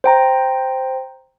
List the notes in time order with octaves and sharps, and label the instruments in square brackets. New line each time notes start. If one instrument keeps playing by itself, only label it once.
[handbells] C5 G5 A#5